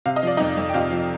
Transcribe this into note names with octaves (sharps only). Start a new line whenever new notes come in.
C3 F5
D#5
F3 D5
F2 D#4 D#5
F2
G5
C3 F4 F5
F3